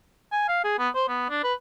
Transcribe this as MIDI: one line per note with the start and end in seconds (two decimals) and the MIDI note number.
0.32 0.46 80
0.48 0.62 77
0.64 0.77 68
0.79 0.89 59
0.95 1.05 72
1.08 1.27 59
1.30 1.43 62
1.44 1.53 71